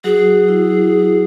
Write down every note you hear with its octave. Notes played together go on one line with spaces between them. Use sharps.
F#3 F#4 G#4
E4